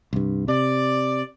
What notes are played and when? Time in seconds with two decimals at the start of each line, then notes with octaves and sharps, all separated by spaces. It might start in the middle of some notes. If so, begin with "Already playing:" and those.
0.13 C2 G2
0.48 C3 D5